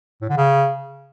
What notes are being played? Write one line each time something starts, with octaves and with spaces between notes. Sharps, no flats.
A2
D3
C#3